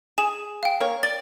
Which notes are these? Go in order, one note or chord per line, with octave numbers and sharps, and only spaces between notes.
G#4 E7
F5 G5
A#3 C#5
D5 A6